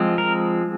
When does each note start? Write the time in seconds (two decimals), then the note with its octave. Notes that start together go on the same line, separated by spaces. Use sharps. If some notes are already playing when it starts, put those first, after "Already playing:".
Already playing: F3 G#3 C4
0.18 A#4